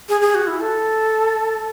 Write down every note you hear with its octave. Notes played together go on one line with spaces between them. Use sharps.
G#4
G#4
F#4
E4
A4